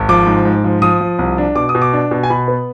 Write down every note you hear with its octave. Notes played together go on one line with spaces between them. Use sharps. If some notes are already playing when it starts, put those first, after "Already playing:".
Already playing: G#1
F3 D6
G#2
G#2
F3
F3 D#6
F3
C2
D4
B2 D6
D#6
B2
D6
D4
B2
G#5
B2 B5
B3